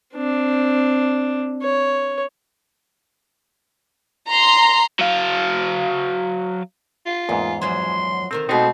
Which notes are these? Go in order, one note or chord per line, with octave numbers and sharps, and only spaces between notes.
C4 D4
C#5
A#5 C6
F#3 F5
F4
E2 G#2 A#3
F#2 F3 F#3 C6
D3 D#3 C4 A#4
B2 G#3 A3 B3 C4 D#4